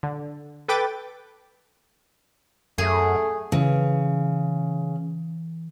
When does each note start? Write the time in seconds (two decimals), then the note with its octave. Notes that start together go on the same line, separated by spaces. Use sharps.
0.03 D3
0.68 A4 B4 G5 D6 A6
2.78 F#2 A3 G#4
3.52 C#3 E3